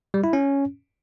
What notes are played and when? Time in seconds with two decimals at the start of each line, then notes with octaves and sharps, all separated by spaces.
0.14 G3
0.24 E4
0.33 C#4